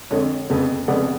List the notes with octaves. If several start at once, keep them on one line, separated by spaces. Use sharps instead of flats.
F2 D3 G#3 C#5
F1 F2 C#3 G#3 B3
F1 F2 C#3 G#3 B3 D5 F#5